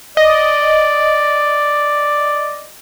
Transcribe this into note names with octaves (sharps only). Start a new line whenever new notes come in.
D5 D#5